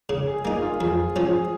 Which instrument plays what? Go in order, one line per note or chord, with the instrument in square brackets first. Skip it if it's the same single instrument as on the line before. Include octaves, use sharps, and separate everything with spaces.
[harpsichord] C#3
[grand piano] G#4
[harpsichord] A#3 D#4 [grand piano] G#4
[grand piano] G#4
F4
[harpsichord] F2 [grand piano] G#4
[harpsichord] F3 C#4
[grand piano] G#4